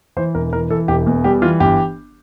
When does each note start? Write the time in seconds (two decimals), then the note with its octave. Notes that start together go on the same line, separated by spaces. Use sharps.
0.17 E3 C5
0.35 E1 A#4
0.53 E3 A#4
0.70 E3 A4
0.88 E1 G4
1.07 E2
1.24 G3 G4
1.42 E3 F4
1.60 G1 G4